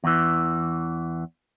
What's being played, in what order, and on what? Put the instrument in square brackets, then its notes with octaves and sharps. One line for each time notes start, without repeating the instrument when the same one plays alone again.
[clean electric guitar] E2 E3